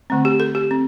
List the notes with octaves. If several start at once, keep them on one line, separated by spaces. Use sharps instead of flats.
D3 A3 C4
G4
A4
G4
C4